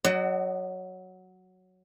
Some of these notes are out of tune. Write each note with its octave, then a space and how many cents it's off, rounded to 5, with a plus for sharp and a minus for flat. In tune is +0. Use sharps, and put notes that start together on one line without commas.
F#3 +0 D#5 -35 F#5 +30